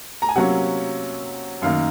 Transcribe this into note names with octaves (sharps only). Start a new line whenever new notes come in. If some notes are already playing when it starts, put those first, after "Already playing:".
A#5
G#5
C3 F#3 A#3 C#4 F#5
F#2 D#3 A#3 F5